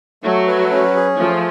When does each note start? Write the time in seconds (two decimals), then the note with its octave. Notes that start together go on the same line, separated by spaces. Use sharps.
0.23 F#3 A3
0.47 B4
0.71 C#4
0.96 G#4
1.19 F3 A3